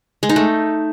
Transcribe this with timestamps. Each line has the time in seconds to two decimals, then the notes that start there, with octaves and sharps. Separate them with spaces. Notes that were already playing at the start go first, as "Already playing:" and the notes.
0.23 G#3
0.29 D#4
0.36 A3